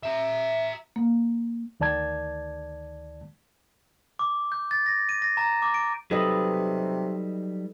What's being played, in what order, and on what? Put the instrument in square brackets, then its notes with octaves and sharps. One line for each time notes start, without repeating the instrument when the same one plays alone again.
[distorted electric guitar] E5 A#5
[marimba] A#3
[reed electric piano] D2 D#3 D5 A5 G#6
[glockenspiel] D6
G6
A6
A#6
D#7
A#6
A#5
D6
D7
[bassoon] C3 [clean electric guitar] F#3 G3 D#4 [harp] A4 B4 D#5